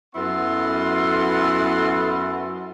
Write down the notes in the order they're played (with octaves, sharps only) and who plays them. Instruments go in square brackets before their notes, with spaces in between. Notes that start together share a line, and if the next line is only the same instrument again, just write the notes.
[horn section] F#2 B3 E4 A4 F#5 C6